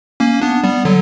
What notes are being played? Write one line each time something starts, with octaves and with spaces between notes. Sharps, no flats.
A#3 C#4
B3 D4
G3 B3
D3 F#3